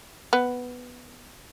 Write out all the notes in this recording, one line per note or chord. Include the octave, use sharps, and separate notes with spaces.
B3